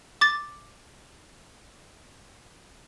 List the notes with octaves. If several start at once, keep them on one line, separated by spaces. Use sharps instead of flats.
D6 A6